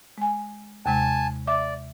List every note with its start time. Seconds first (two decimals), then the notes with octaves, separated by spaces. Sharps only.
0.18 G#3 G#5
0.86 D#2 C3 G#3 G#5 A5
1.47 D5 E5 D6